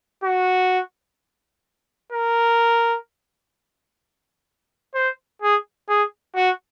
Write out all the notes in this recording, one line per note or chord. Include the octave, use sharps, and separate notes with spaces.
F#4
A#4
C5
G#4
G#4
F#4